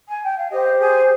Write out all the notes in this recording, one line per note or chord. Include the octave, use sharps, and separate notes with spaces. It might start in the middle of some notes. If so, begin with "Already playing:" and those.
G#5
G5
F5
G4 C5 D#5
G#4 G#5